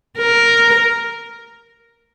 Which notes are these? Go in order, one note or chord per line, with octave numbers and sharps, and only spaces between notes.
A#4